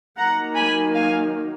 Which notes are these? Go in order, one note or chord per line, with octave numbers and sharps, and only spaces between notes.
D#3 F#3 A#3 F#5 A#5
G#5 B5
F5 G#5